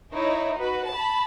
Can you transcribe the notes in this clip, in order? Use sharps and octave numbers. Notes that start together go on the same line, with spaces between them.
D#4 E4 C#5
F#4 B4
A5 B5